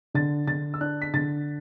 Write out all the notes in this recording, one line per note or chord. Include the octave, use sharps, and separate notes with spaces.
D3 A6
D3 A6
E6
D4 F#6
B6
D3 A6